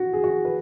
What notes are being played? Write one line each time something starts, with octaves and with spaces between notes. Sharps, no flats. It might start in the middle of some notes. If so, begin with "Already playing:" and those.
Already playing: F#4
G#4
F#4
B4